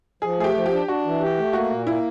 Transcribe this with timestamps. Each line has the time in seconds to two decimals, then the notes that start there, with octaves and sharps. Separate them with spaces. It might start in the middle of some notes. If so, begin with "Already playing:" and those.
0.22 F3 G#4
0.38 A3 G#4
0.44 G4
0.54 F3
0.66 G4
0.71 D4
0.87 D4 F#4
1.04 E3
1.21 G4
1.37 A3
1.53 A#3 F#4
1.70 A#2
1.86 A#3 E4